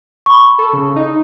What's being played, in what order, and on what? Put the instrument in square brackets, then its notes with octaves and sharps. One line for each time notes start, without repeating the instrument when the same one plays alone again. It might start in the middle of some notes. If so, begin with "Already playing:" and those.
[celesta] B5 C#6
[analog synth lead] A4
C#3
D#4